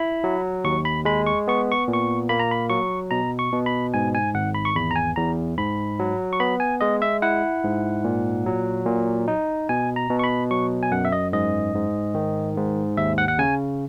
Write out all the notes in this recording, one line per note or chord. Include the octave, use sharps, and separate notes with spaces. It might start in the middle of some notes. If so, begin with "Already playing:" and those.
Already playing: E4 B5
F#3
D#2 C#6
B5
G#3 B5
C#6
B3 C#6
C#6
A#2
C#6
A#3 B5
A#5
B5
F#3 C#6
B2 A#5
C#6
B2
B5
G#2 G#5
G#5
G#1 F#5
B5
C#6
E2 B5
A#5
G#5
E2 A#5
G#2 B5
F#3
C#6
B3 B5
G#5
G#3 D#5
E5
E4 F#5
G#2
A#2
F#3
A#2
D#4
B2 G#5
A#5
B2
C#6
B5
F#3 C#6
G#5
F#2 F#5
E5
D#5
G#2 D#5
G#2
D#3
G#2
D#2 E5
F#5
F#5
C#3 G#5